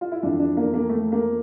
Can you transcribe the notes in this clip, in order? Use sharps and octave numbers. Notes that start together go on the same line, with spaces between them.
F4
E4
F2 E3 D4
D4
A#3
A#3
A3
A#3